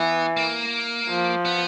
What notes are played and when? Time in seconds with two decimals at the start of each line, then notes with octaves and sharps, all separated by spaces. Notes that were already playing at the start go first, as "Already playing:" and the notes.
Already playing: E3 B3
0.37 A#3
1.09 F3
1.45 B3